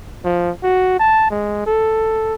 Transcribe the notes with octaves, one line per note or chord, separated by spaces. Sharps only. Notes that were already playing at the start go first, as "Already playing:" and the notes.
F3
F#4
A5
G#3
A4